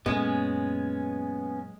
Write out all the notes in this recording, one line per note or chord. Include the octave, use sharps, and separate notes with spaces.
F#2 A#2 G#3 B3 C#4